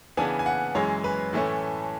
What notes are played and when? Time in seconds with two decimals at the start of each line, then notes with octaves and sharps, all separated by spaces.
0.17 C#3 E3 B3 D4 G#5
0.39 G#5
0.46 F#5
0.75 F#2 E3 G#3 C#5
1.04 B4
1.33 A2 E3 A3 C#4